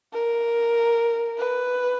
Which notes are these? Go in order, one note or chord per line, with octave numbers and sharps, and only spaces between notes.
A#4
B4